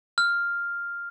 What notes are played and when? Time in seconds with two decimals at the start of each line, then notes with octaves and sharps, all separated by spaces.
0.18 F6